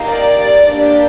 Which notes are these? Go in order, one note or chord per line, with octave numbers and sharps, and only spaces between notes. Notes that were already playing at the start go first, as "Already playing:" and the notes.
Already playing: A#3 D#4 G4
D5
A#3 D4 G4